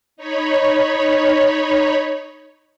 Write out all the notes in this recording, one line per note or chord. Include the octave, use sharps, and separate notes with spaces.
D#4 C#5 B5